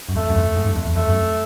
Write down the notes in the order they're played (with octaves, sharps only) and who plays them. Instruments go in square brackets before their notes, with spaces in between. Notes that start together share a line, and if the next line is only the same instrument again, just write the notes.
[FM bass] F#2
[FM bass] F2 [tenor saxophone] A3
[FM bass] F#2
F2
G#2
G2
F2
E2
[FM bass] F2 [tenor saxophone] A3
[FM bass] F#2